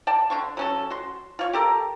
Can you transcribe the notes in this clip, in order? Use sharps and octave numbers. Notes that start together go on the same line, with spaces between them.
D5 G5 A5
D3 D4 C#6
F#3 C#4 A4
F#4 C6
F4 C#5
G4 A4 A#4